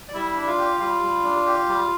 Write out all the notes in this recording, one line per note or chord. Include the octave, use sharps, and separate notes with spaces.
D5
G3 E4 E5
D4
F4 F5
G4
G3 F4 F5
G3
D4
G4
G3